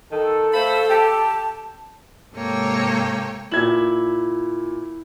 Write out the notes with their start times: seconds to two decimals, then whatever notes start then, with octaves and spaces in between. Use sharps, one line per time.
0.12 D#3 A4
0.54 A3 C5 F5 B5
0.90 G4 A5
2.34 G#2 C3 A#3 A4 C#5 G5
3.52 A#2 E4 G#6 F#7